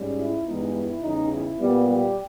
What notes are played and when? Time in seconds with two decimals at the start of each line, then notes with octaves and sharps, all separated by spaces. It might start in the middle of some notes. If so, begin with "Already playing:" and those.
Already playing: G#2 G3 C#4
0.18 E4
0.45 G2 E3 G#3 B3 D#4
0.74 E4
1.02 E2 C#3 G3 D#4
1.30 E4
1.58 A#2 G3 B3
1.86 G3 G4